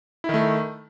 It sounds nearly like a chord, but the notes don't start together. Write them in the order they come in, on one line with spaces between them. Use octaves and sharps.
E4 D#3 A3